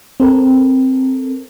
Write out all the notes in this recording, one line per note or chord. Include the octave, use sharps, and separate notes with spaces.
C4 A4 A#4